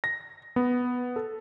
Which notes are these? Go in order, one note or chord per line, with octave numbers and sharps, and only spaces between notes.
A#6
B3
A4